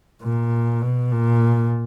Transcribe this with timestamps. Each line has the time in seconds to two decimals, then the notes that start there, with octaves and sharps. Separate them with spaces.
0.23 A#2
0.82 B2
1.11 A#2